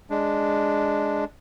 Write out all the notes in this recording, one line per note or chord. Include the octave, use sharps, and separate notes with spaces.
G#3 D4